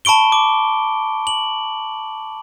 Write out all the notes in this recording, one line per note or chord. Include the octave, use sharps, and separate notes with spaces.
A5 B5 C#6 D7 G7
D6
F#7